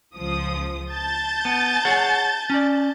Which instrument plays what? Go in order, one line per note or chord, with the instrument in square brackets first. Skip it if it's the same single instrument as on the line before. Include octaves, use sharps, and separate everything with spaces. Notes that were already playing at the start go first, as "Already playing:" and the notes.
[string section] C#2 F3 D#6
A5 G6 A6
[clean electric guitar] B3
G#4 C#5 F#5
C#4 D5